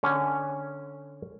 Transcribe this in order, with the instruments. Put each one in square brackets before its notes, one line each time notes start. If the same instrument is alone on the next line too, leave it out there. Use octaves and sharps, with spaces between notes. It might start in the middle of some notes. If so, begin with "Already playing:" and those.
[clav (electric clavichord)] D3 C#4